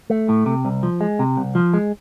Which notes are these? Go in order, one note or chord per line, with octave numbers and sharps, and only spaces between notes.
A3
A2
C3
C2
F3
G#3
C3
C2
F3
G#3